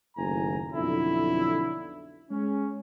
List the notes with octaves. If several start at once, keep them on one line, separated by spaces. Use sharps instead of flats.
F#1 D#2 A2 G#5 A#5
B1 F2 D3 E4
G#3 C#4